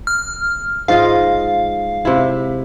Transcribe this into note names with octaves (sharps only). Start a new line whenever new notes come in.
F6
G#2 F4 D#5 F5
C3 E4